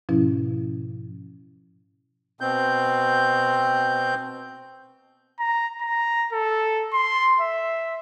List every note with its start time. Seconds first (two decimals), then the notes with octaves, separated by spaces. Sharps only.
0.09 G#2 B2 F3 C#4 E4
2.41 B2 C4 G6
5.40 A#5
5.81 A#5
6.33 A4
6.93 C6
7.40 E5